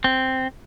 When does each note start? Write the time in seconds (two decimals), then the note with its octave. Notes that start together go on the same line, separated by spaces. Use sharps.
0.04 C4